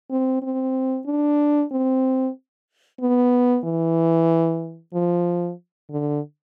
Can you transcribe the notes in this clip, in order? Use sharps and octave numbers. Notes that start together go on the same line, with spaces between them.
C4
C4
D4
C4
B3
E3
F3
D3